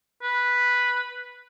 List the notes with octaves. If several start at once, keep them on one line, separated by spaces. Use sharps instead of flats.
B4